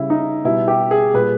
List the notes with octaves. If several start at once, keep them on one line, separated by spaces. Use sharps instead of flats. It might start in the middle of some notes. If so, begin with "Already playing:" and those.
Already playing: C#3 G3 E4
D#4
B2 G3 E4
G4
G#4
A#2 G3 B4